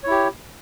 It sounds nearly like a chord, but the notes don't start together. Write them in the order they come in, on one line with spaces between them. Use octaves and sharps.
C#5 E4 G4